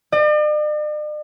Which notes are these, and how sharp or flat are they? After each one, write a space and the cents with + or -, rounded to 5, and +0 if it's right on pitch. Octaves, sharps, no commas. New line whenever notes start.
D5 +45